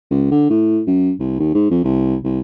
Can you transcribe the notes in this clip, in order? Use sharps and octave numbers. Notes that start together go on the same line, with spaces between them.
C#2
D3
A2
F#2
C2
D#2
G#2
F2
C2
C2